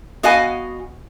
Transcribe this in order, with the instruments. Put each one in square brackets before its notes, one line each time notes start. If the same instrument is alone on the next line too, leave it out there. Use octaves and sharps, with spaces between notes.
[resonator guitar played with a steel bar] B3 F#4 D#5 F5 G#5